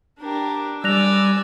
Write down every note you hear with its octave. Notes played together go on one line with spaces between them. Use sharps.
D4 G4 A#4
G3 D5 G#5 E6 F#6 A#6 F7